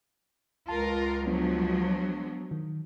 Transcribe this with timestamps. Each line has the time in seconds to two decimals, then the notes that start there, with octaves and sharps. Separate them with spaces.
0.68 C#2 F4 A#4 A5
1.26 F3 F#3 G#3 B3 D4
2.51 D#3